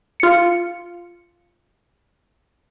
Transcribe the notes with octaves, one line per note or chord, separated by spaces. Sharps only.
F4 C#7